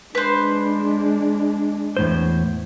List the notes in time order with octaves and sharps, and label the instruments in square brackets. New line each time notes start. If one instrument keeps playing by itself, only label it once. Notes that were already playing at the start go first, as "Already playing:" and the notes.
[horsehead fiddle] G#3 D4 [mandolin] B4 C5
[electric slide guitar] E2 A2 C5